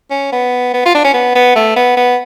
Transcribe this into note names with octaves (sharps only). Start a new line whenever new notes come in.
C#4
B3
B3
F4
D4
C#4
B3
B3
A3
B3
B3